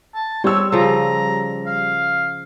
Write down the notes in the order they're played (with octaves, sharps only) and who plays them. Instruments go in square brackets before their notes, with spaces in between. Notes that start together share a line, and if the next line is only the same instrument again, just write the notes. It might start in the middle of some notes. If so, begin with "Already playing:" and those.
[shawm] A5
[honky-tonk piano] G3 E6 [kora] C4 [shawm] C#5
[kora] C#3 F3 [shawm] A#5
[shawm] F5